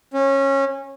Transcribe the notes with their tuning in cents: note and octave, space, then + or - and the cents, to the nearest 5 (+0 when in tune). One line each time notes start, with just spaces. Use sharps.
C#4 -20